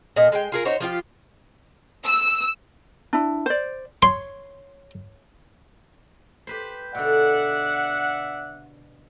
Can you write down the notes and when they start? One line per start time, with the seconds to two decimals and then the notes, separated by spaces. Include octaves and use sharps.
0.16 A#2 A4 D#5
0.32 G#3 G5
0.52 F4 G#4 A#4
0.65 D#4 F#4 C5 C#5
0.80 F3 F4 G4
2.06 E6
3.13 D4 E4
3.46 C5 D5
4.02 C#5 C6
6.47 G4 B4 C5
6.95 B2 D3 D5 E5 F#5